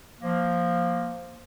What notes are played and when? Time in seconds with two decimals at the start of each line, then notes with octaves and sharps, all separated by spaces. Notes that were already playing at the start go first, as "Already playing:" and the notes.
0.22 F3 A#3